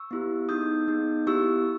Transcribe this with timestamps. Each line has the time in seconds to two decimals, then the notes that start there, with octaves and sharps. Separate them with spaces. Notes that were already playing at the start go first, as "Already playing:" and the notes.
Already playing: C#6 E6
0.11 B3 E4 G4
0.49 B3 D#4 G#4 D#6 G6
0.88 B3 D#4 G#4
1.27 B3 E4 G4 C#6 E6